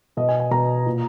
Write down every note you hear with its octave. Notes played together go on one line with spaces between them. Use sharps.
B2 D#5
G#5
G#5
B2 A#5
A#2